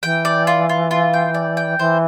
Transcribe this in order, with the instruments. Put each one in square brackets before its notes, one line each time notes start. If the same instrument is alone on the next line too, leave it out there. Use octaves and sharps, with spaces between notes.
[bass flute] E3 [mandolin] G5
[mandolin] D5
F4
F4
F4
G5
D5
G5
[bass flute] E3 [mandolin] C5